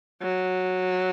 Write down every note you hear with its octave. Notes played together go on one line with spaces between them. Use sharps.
F#3